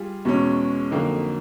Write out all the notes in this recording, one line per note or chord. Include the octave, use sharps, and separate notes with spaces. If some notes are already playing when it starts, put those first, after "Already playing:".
Already playing: G3 F4 G#4
E2 B2 G#3 C#4
F2 D3 F#3 A#3 D#4